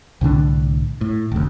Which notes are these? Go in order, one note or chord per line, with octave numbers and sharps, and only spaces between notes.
C2 A2 D3 D4
A2
F1 D2